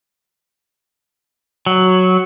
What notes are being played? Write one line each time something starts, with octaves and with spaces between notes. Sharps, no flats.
F#3